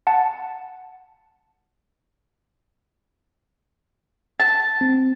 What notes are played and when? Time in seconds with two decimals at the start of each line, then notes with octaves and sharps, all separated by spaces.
0.07 F#5 A5
4.40 A5
4.81 C4